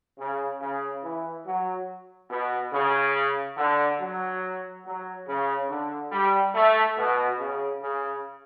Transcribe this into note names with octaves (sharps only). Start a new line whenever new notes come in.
C#3
C#3
E3
F#3
B2
C#3
D3
F#3
F#3
C#3
D3
G3
A3
B2
C#3
C#3